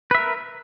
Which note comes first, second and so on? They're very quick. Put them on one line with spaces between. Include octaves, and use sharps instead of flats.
B4 E5 A#4